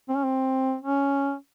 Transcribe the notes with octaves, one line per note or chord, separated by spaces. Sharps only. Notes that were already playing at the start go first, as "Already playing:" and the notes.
C4
C#4
C4
C#4